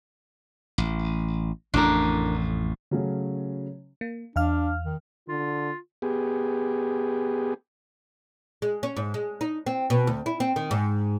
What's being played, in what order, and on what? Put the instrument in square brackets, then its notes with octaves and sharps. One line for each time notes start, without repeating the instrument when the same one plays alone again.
[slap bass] A1
[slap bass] A1 F2 A2 [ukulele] D4 A#4
[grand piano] C#3 F#3 A3 C#4
[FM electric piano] A#3
[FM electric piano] E2 F5 F6 [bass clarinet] D4
[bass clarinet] D#3
[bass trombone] D3 [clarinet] F4
[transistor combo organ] B3 G4 G#4
[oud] G#3
C#4
G#2
G#3
D#4
C4
B2
D2
E4
C4
D#3
G#2